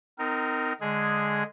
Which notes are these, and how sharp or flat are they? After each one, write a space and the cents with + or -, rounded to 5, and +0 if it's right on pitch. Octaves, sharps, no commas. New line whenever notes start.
C4 -40 D#4 +0 A#4 -15
D3 +0 G#3 +0 G#4 +0